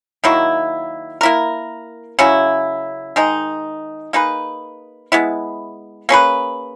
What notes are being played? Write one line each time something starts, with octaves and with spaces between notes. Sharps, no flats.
D#3 F#3 A#3 E4
A#3 E4 A#4
C#3 F#3 C#4 E4
D#3 G#3 D#4
A#3 D#4 G#4 B4
G#3 B3 E4
A#3 C#4 G#4 B4